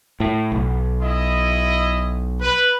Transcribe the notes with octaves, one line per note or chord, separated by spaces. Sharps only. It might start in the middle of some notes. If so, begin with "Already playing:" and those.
A2
B1
E4 D#5
B4